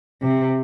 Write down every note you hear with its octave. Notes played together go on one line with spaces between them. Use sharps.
C3